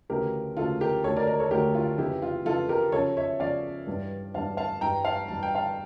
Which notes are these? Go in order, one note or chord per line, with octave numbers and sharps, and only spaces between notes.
D2 C#3 E3 G4 A#4
D2 C#3 E3 F4 A4
G4 A#4
D2 D3 A3 A4 C#5
A#4 D5
A#4 D5
A4 C#5
D2 D3 A3 G4 A#4
F4
F2 C#3 E3 E4 G4
F4
F2 C#3 E3 F4 A4
G4 A#4
C#3 F3 C#4 A4 C#5
C#5 E5
C#3 F3 C#4 D5 F5
G2 E3 G3 D4
G2 E3 G3 D4 F5 A5
F5 A5
G2 E3 G3 G5 A#5
F5 A5
G2 E3 G3 A5
G5
F5 A5